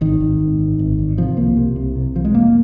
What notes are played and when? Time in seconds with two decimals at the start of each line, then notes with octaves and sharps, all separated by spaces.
0.01 G#1 D#3
0.20 G#1
0.40 G#1
0.59 G#1
0.79 G#1
0.98 G#1
1.18 C3 F3
1.37 C2 A#3
1.57 C3
1.76 C2
1.96 C3
2.15 C2 F3
2.25 G#3
2.34 F1 A#3